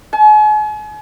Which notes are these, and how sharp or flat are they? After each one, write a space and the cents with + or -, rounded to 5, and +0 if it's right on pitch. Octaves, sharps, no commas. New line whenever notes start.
G#5 +40